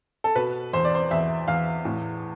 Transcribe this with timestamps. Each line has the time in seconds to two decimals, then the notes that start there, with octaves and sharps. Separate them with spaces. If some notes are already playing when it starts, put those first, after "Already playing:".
0.24 A4
0.35 B2 B4
0.73 E2 C5
0.85 D5
0.95 C5
1.11 E2 E5
1.48 E2 F5
1.85 A2